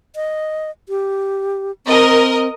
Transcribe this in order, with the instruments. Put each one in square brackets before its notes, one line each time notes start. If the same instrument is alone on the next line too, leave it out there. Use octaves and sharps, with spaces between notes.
[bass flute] D#5
G4
[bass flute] C4 [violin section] A#4 D#5